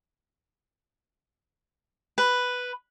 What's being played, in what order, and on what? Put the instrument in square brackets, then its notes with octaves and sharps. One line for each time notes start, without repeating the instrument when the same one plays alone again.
[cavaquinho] B4